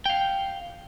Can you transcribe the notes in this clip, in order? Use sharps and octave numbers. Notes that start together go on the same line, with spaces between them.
F5 G5